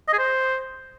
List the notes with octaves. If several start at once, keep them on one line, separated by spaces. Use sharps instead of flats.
D#5
G#4
C5